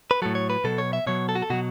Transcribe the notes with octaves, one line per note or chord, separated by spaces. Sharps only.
B4
A2 F#3 A4
C#5
B4
B2 F#3 A4
C#5
E5
B2 F#3 C#5
A4
F#4
A4
B2 F#3 F#4